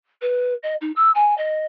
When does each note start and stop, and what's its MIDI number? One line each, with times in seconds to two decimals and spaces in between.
0.21 0.54 71
0.63 0.74 75
0.81 0.91 63
0.96 1.10 88
1.15 1.37 80
1.37 1.65 75